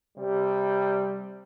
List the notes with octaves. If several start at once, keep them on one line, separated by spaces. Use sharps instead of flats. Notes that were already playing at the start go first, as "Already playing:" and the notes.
C3 G3